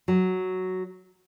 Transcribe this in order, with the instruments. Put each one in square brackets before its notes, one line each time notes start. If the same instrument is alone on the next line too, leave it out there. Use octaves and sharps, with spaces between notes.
[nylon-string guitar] F#3